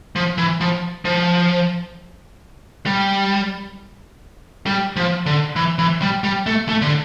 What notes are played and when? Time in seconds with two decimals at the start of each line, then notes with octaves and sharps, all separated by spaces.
0.16 F3
0.38 E3
0.61 F3
1.05 F3
2.86 G3
4.66 G3
4.96 F3
5.26 D3
5.56 E3
5.79 E3
6.02 G3
6.24 G3
6.46 A3
6.69 A3
6.82 D3